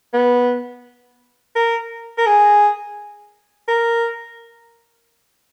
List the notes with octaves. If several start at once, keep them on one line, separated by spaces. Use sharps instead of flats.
B3
A#4
A#4
G#4
A#4